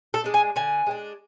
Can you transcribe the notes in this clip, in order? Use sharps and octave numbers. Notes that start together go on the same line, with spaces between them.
A4
G#3 D4
G#5
D3 G#5
G#3 D4